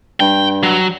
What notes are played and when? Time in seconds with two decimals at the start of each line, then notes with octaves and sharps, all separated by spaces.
0.20 G2 G5
0.63 F#3